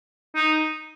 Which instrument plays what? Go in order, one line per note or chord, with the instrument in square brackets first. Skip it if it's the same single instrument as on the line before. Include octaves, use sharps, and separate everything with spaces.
[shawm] D#4